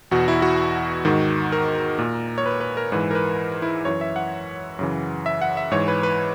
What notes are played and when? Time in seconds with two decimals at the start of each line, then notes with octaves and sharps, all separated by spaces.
0.11 E2 B2 F#4
0.28 E4
0.42 F#4
1.05 G#2 D#3
1.52 A#4
1.99 A#2
2.38 C#5
2.46 B4
2.60 B4
2.77 A#4
2.92 G#2 E3 B4
3.11 A#4
3.15 B4
3.62 E4
3.85 F#2 E3 C#5
4.01 E5
4.16 F#5
4.79 F#2 C#3 E3
5.26 E5
5.41 F#5
5.57 E5
5.71 G#2 E3 C#5
5.88 B4
6.03 B4